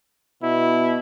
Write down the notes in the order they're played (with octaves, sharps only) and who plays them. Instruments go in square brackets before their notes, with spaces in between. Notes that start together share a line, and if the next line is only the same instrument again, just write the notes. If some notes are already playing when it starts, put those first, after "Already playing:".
[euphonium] B2 [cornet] E4